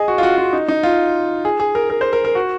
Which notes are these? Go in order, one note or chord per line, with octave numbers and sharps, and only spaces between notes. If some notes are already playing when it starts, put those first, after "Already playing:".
Already playing: G#4 D#5
F#4
F4
F#4
F4
D#4
D#4
F4
G#4
G#4
A#4
A#4
C5
A#4
A#4
F#4